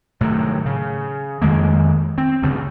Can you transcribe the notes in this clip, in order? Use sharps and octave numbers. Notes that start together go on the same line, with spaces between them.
A2 C3 D#3 F#3
C#3
F2 D#3 G#3 A#3
C4
D2 G2 C#3